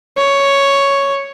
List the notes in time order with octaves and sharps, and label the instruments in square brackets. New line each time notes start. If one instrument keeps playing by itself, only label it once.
[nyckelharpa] C#5